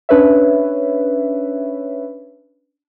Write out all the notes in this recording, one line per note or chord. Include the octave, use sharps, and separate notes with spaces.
C#4 D4 B4 C#5 E5